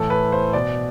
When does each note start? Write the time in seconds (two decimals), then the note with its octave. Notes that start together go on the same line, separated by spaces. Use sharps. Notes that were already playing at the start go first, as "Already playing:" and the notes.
Already playing: A2 E3 A4
0.10 B4
0.32 C5
0.53 B2 D5